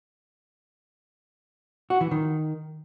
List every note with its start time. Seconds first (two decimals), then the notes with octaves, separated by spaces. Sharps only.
1.90 F#4
2.01 E3
2.11 D#3